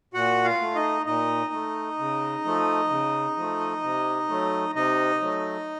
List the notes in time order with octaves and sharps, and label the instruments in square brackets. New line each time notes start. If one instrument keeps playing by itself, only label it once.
[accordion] A#2 F#4 F#5
F4 F5
A3
D#4 D#5
A#2 D#4 D#5
A3
C#3
F3 A3
C#3
F3 A3
C3
F#3 A3
C3 D#4 D#5
F#3 A3